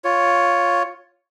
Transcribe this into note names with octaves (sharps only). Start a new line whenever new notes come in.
F4 C#5